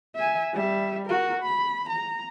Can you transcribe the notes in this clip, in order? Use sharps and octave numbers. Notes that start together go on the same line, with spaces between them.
E5 G#5
G3 E5
F#4 A#4
B5
A#5